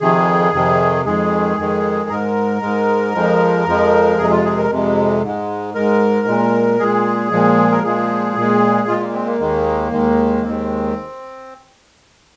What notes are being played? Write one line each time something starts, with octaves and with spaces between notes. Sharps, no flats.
F2 C3 D#3 G#4
F2 C3 D#3
F2 D#3 G#3 G#4
F2 D#3 G#3
G#2 G#3 A#4
G#2 G#3
F2 F3 G#3
F2 F3 G#3
F2 C3 G#3 G#4
F4
G#4
A#4
F2 C3 G#3
G#2 G#3
G#2 G#3 A#4
A#2 G#3
A#2 G#3 G#4
A#2 F3 G#3
A#4
A#2 F3 G#3 G#4
A#2 G#3
A#2 G#3 F4
A#3
C4
A#3
D#2 D#3 G#3
D#2 D#3 G#3
D#2 D#3 G#3 C4